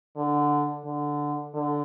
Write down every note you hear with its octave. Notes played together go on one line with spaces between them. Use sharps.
D3
D3
D3